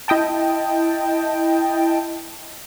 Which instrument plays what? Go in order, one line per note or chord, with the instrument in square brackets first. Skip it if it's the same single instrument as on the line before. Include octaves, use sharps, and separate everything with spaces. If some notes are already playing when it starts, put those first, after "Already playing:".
[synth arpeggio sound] E4 D#5 G5 A5